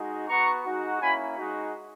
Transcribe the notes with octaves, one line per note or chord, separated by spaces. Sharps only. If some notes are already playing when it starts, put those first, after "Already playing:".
Already playing: G#3 D#4 F#4
B3 F#4 A#5 C#6
G#3 D#4 F#4
A#3 C#4 E4 G#5 B5
G#3 D#4 F#4